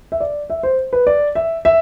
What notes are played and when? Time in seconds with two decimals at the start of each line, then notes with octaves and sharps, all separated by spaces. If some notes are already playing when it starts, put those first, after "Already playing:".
0.12 E5
0.20 D5
0.50 E5
0.63 C5
0.93 B4
1.07 D5
1.35 E5
1.65 E5